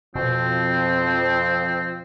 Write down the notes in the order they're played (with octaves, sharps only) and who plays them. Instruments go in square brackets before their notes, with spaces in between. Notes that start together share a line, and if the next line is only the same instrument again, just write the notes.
[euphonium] F2 [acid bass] B2 [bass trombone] F3 [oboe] C4